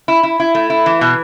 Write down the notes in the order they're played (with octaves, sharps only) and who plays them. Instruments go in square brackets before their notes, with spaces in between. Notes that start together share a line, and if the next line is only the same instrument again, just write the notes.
[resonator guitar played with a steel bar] E4
E4
E4
A3
E4
E3
B2